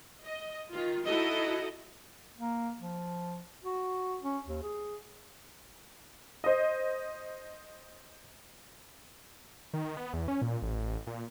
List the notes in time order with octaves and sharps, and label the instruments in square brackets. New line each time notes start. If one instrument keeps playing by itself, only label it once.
[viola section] D#5
D#3 F4
D#4 E4 F#4 A4 D#5
[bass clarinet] A#3
F3
F#4
C#4
D#2
G#4
[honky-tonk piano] C5 D#5
[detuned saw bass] D#3
B3
E2
C#4
A#2
A1
A#2